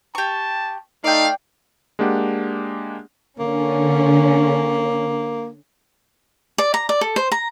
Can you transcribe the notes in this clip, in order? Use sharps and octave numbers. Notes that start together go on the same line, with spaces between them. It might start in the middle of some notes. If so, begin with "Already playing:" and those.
G4 A5 C#6
A3 D#4 D5 F5 G5
G#3 A#3 D4 G4 F#5
D3 A#3 C#4
D5
A#5
D5
A4
C5
A#5